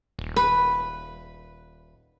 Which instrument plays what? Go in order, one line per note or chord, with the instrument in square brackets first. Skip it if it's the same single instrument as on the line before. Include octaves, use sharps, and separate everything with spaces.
[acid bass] D#1
[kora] B4